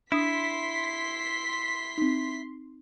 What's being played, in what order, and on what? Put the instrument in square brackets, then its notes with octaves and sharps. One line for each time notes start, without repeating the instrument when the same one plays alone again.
[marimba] D4 D#6 [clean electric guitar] E4 [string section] C6 B6
[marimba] C4 D#4